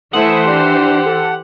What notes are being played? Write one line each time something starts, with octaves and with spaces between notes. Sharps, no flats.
E3 A3 E4 C5 F#5 D#6
D4 G4
A4